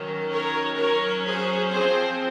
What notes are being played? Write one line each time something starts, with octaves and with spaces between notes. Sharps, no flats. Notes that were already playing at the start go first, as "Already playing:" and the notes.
Already playing: D#3 F#3 C#4
A#4 C#5
F#3 C#4 A#4 C#5
G#4 C5
F3 C4 G#4 C5